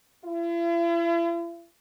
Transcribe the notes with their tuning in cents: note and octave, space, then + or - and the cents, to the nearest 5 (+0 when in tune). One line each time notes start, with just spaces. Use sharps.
E4 +45